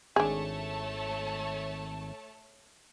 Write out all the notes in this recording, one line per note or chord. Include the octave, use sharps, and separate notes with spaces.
G#1 A3 D4 G#4 C#5 A5